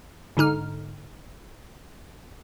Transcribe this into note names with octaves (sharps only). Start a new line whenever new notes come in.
G#2 D3 D#4 F6